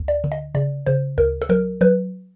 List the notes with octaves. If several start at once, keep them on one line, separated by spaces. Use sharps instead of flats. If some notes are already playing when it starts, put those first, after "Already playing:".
Already playing: D2
D5
D3
D#5
C#3 D5
C#3 C5
D2 A#4
A4
F#3 A#4
F#3 B4